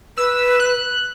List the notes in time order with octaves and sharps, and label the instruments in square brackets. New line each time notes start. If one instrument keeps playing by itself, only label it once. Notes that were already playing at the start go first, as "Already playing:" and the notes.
[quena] B4 [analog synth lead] E6
[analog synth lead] F#6